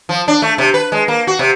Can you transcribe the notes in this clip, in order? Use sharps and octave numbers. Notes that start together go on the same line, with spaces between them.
F3
D4
A3
C3
B4
G#3
A#3
F#4
C3